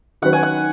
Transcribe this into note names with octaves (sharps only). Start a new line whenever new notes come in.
D#3 F#3 C#4 F#4 B4 F#5
G#5
F#5